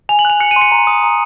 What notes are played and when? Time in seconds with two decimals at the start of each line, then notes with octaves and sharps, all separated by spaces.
0.09 G#5 F7
0.19 F#7
0.25 F#6 F7
0.40 F#6 C#7
0.51 D#7
0.56 C6
0.61 C#7
0.72 A#5
0.87 D#6
1.04 A#5